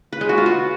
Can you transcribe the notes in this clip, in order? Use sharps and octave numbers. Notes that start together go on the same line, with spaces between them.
B4
G#3
F#4
F4
F#4